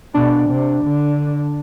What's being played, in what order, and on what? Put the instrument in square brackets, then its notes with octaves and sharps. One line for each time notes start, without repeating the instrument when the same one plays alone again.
[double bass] B2 [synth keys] D4
[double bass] C3
D3